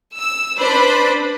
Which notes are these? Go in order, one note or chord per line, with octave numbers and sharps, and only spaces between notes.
E6
D4 B4 C5 B5